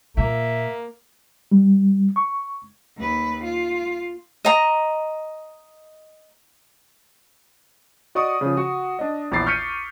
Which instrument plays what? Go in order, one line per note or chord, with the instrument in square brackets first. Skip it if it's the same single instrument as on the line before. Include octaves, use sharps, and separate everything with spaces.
[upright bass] A#2 [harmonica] A#3 [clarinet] E5
[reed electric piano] G3
C#6
[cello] D#2 B4
F4
[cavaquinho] D#5 A#5
[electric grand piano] F#4 D5 D#5 C#6 D#6
C#3 F3
F#4 F#5
D4 D#5
A#1 E2 E4 D6 A6 C7
C#6 F6 G6 B6 C#7 D#7